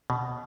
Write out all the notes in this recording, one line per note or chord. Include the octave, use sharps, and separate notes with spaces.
B2